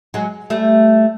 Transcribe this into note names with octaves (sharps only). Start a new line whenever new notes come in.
F#3 G#3
G3 A3